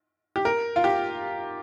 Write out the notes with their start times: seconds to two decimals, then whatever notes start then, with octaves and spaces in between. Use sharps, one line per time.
0.36 G4
0.45 A#4
0.76 F4
0.84 G4